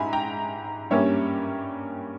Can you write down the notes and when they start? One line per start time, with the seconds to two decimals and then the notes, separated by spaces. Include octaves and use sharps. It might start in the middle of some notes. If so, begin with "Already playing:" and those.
Already playing: G#2 E5 G#5 A#5 B5
0.13 G5 A#5
0.91 G2 G3 A#3 C#4 C#5 E5